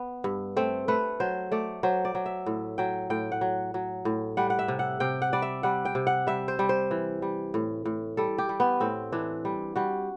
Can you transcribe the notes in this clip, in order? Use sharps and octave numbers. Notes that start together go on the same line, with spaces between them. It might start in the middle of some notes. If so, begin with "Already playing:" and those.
Already playing: B3
G2
A3 C4
A3 B4
F#3 C5
A3 D5
F#3 C5
D5
F#3
E5
A2
F#3 G5
A2 G5
F#5
F#3
F#3
A2
G3 F#5
F#5
E5
C3
F#5
C3 G5
F#5
G3 D5
E5
G3 F#5
G5
C3
F#5
G3 E5
C5
G3
C5
E3
G3
A2
A2
G3 A4
G4
G3
B3
A2 C4
E3 D4
G3
G3 F#4